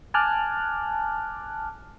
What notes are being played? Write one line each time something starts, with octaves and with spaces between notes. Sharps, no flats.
G#5 A5 D6 F6 F#6